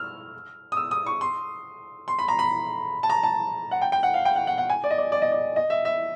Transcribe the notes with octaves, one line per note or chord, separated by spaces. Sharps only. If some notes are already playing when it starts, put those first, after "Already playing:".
Already playing: E6 F6
D#6
E6
D#6
C#6
C6
C6
B5
A#5
B5
A5
A#5
A5
F#5
G5
G5
F#5
F5
G5
F#5
F#5
F#5
G#5
D5
D#5
D5
D5
D#5
D5
D#5
E5
E5